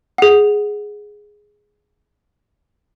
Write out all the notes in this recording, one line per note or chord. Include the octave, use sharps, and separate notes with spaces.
G#4 F#5